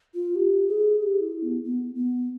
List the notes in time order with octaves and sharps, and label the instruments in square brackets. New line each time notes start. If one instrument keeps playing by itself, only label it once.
[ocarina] F4
G4
G#4
G#4
G4
E4
B3
B3
B3